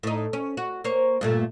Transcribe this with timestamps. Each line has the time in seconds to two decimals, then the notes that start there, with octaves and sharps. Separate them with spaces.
0.03 A2 D#4
0.33 C#4
0.57 F#4
0.84 A#3 C5 C#5
1.21 G2 A#2 A3